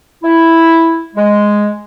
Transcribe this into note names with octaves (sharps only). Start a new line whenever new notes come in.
E4
G#3